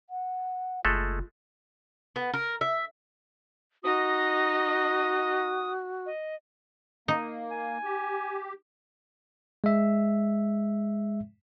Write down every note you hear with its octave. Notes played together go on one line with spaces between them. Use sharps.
F#5
F#1 G#3 A3 F4 A4
B3
A#4
E5
D#4 F#4 D#5 D#6
D#5
A#3 D#4
G#5
G4
G#3 E5